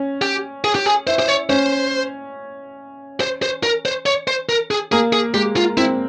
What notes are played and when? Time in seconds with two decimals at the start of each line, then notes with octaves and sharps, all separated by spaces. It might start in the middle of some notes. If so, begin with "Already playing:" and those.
Already playing: C#4
0.22 G4
0.64 G#4
0.75 G4
0.86 G#4
1.07 E4 C5
1.19 C5
1.28 C#5
1.49 C#4 C5
3.21 C5
3.42 C5
3.63 A#4
3.85 C5
4.06 C#5
4.27 C5
4.49 A#4
4.71 G#4
4.92 A#3 G#4
5.13 G#4
5.34 G#3 G4
5.57 F4
5.77 C4 E4